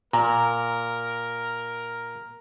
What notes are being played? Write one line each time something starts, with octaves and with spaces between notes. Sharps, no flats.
A#2 A#4 A#5